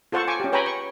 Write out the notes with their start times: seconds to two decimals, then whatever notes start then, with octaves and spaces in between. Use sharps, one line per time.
0.12 F4 A4 C5 F#5 A5 C#6
0.28 G#5 C#6 D6
0.40 C#4 G4
0.52 B4 C#5 G5 G#5 A#5 B5
0.66 C#6